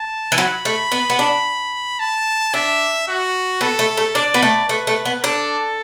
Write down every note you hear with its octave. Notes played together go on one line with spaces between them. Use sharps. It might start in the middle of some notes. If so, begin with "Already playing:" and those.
Already playing: A5
E3
F#3 B5
A3
B3
B3
D4
A5
D4 E5
F#4
B3 A4
A3
A3
D4 D5
B3
A3
A3 B4
A3
B3
D4 A4